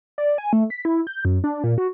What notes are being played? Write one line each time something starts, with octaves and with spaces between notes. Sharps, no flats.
D5
G#5
A3
B6
E4
G6
F#2
D4
A#2
F#4